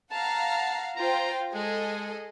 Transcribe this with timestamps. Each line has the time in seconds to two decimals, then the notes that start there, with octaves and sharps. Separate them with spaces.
0.11 F5 F#5 A5 A#5
0.96 F4 C5 G5 A#5
1.54 G#3 G#4 A4 D#5